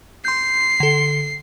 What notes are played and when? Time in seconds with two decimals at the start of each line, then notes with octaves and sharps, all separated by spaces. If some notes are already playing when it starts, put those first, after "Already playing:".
0.25 C6 G6 C7
0.80 D3 A4